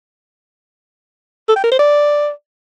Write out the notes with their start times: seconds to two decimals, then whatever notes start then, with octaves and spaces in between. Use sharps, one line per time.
1.49 A4
1.56 G5
1.64 A#4
1.72 C5
1.79 D5